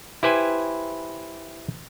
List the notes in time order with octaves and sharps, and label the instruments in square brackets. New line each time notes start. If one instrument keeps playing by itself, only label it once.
[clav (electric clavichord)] E4 G4 B4 C5 G#5